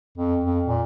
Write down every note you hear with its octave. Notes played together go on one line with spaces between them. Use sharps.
F2
F2
A#2